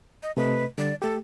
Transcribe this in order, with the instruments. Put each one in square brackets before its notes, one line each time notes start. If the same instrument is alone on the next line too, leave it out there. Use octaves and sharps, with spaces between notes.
[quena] D#5
[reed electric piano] C3 A3 D#5 [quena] B4
[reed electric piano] D3 G3 [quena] D5
[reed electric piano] A3 G4 [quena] A4